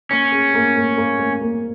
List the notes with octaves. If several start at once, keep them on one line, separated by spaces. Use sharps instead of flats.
A#3 C#4
G#4
A#3
A#3
A#3
A#3
A#3